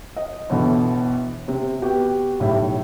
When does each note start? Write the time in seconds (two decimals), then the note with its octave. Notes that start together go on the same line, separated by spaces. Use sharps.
0.16 D#5
0.50 G1 B2 E3 A4
1.48 C3
1.82 B3 F#4 G4
2.40 B1 A2 G3 E4 E5